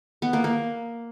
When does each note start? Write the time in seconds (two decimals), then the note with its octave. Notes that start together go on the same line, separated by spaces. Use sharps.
0.22 B3
0.33 A#3
0.44 A#3